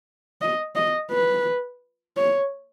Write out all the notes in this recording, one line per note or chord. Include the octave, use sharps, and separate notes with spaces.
D#5
D#5
B4
C#5